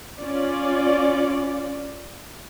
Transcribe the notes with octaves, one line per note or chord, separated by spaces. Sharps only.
C#4 F4 D5